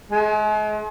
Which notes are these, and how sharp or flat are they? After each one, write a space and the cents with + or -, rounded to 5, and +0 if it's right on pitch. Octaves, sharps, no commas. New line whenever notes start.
G#3 +40